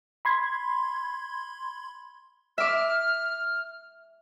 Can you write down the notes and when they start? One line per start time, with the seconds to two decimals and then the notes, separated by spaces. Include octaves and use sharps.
0.25 B5 C6 G#6
2.58 E5 D6 F6